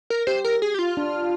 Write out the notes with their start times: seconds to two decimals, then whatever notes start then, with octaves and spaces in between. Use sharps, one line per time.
0.10 A#4
0.27 G4 C5
0.44 A#4
0.62 G#4
0.74 G4
0.79 F4
0.97 D4